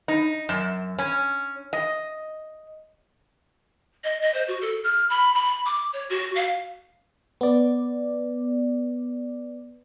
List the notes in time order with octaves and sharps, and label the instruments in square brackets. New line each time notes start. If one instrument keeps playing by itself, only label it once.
[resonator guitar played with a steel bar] D#4
F#2
C#4
D#5
[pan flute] D#5
D#5
C5
F#4
A4
F6
B5
B5
D6
C#5
F#4
F5
[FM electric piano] B3 D5